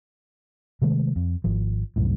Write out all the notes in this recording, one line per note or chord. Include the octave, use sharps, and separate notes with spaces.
C3 D#3 G#3 A3
F2
G#1 F3
C2 F#2 A2